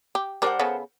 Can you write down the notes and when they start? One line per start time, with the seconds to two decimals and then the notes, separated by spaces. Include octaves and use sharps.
0.15 G4
0.42 G3 D4 A#4 C5 F#5
0.59 C#3 B3 A4